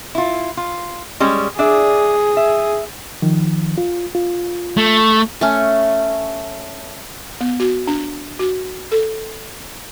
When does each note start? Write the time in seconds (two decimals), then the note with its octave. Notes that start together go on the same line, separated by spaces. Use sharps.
0.15 E4 F4
0.57 F4
1.20 G3 G#3 C#4
1.59 D4 G#4 D5 E5
2.37 E5
3.22 D#3 F3
3.78 F4
4.15 F4
4.77 A3
5.41 A3 C#4
7.41 B3
7.60 F#4
7.87 D4
8.39 F#4
8.92 A4